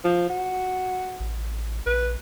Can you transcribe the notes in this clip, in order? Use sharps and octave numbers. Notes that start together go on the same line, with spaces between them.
F3
F#4
A1
A#1 B4